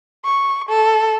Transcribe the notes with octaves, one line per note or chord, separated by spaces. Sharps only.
C#6
A4